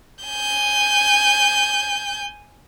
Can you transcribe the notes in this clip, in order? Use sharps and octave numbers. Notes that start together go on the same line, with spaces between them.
G#5 G6